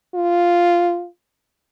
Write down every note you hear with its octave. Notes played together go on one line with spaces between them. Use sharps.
F4